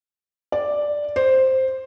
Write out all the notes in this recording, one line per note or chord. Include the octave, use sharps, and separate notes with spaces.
D5
C5